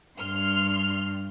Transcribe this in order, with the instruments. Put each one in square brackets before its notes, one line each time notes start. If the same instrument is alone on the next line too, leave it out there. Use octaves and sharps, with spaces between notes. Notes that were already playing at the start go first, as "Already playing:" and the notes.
[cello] G2 [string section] C6 F6